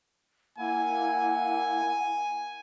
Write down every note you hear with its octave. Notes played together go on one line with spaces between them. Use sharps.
A#3 E4 F#5 G#5